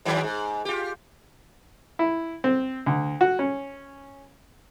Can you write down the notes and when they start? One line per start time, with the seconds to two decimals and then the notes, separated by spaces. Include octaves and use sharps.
0.05 G#2 D#3 F#3
0.23 G#2
0.65 F4 G4
1.99 E4
2.44 C4
2.86 D2
3.21 F#4
3.39 C#4